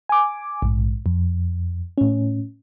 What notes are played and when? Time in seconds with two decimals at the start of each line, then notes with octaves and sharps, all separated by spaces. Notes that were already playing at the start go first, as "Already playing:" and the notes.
0.09 G#5 D6
0.62 A#1 G#2
1.06 F2
1.98 A2 C#4